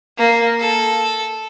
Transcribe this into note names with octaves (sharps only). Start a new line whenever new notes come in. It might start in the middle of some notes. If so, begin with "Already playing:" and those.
A#3
A4